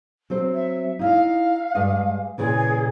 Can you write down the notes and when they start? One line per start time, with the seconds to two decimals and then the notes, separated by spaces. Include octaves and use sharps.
0.30 F#3 C4 C5
0.53 E5
0.99 D#4 E4 D#5 F5
1.75 G2 G#3 D#5
2.38 A#2 C#3 E3 G#4